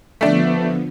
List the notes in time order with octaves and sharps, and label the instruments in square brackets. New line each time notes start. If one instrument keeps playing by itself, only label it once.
[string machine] D3 F3 B3 [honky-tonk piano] A3 D4